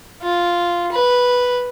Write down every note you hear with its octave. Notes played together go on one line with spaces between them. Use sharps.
F4
B4